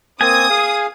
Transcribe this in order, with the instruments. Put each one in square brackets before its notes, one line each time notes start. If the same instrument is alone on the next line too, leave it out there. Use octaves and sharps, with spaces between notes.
[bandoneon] A#3 C4 [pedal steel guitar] G#5 [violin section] D#6
[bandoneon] G#4 F5